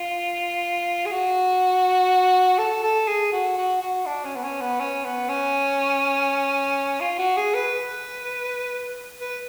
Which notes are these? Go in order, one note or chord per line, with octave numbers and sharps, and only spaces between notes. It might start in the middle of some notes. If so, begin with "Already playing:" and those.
Already playing: F4
G#4
F#4
A4
A4
G#4
F#4
F#4
F#4
D4
C#4
B3
C#4
B3
C#4
B3
C#4
F4
F#4
G#4
B4
B4